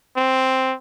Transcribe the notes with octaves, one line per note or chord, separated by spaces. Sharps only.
C4